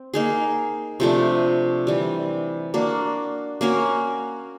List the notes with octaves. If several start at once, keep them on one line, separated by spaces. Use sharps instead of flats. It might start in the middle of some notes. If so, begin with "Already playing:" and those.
Already playing: C4
A#3 D#4 G#4
C3 F3 A3 D4
C3 E3 G3
A#3 D4 F#4 A#4
A#3 C#4 F#4 A#4